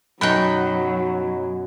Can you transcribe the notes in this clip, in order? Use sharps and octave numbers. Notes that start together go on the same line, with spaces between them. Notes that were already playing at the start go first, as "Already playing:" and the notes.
F#2 B2 F#3 B3 D#4 G5 B5 F#6